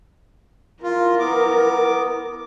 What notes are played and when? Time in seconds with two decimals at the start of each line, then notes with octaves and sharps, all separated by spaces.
0.83 E4 F4 A#4
1.20 B3 D6